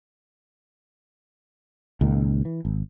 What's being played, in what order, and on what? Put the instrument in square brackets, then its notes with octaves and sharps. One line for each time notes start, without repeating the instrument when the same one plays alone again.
[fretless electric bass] C#2 A#2 D#3
E3
G#1